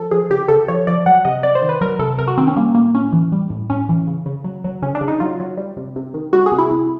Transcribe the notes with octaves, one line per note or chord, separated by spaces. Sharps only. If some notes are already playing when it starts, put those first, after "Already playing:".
Already playing: F3 A4
F3 G#4
C#3 G4
C#3 A4
F3 C#5
F3 D5
F#3 F#5
C3 D#5
C3 D5
C5
D#3
B4
F#3 A#4
C3 A4
C3 A#4
F#4
D#3 C4
C#4
G3 A#3
A2 A#3
A2 C#4
E3
G3
A2
A2 C#4
E3
C#3
C#3
F#3
F#3
C#3 C#4
D4
C#3
D#4
F#3 F4
F#3
G3
C3
C3
D#3
G3 F#4
G#4
C3
E4
C3